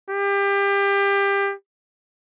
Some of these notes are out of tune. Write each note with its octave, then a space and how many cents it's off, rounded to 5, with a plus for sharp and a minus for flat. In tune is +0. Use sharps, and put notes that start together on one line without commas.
G4 +25